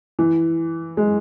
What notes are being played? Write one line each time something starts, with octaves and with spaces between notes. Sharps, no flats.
E3
G#3